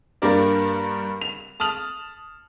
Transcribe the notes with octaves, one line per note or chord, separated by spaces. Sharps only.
G2 A#3 D4 G4 A#4 D5
F7
A5 D#6 F6 F7 F#7